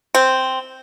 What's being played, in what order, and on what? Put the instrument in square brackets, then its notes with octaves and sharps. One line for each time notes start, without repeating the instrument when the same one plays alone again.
[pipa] C4